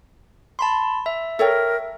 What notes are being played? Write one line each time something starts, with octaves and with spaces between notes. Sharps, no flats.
A5 B5 C6
E5
A4 A#4 C#5 E5 G5